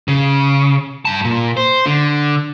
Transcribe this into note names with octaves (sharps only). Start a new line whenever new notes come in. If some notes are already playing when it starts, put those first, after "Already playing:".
C#3
G2 A5
A#2
C5
D3